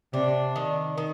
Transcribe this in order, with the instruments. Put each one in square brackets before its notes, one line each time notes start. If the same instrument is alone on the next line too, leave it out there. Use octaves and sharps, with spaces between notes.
[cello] C3 [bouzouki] D4
[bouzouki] D#3
D#3